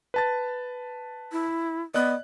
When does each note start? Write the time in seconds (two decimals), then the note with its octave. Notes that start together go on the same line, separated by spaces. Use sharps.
0.14 B4 A5 A6
1.32 E4
1.94 B3 D5 D#5 F#6